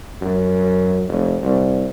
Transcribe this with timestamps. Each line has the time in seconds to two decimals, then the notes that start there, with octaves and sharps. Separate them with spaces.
0.22 F#2
1.08 F1
1.42 C2